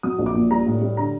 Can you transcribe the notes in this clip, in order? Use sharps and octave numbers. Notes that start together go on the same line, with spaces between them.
F#3 D#6
A#1
D6
A#2
G3 A#5
A2
G3
D3 A#5